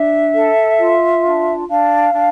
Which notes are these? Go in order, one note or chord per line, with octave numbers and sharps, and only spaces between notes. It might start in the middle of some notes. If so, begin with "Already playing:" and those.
Already playing: D4 E5
A4
F4
D4
D4 F5
D4